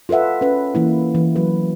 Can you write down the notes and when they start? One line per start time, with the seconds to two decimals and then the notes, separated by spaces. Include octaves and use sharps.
0.09 F4 A4 B4 E5 F#5
0.41 C#4 B4
0.75 E3 A#3 E4
1.15 E3
1.36 F#3 B4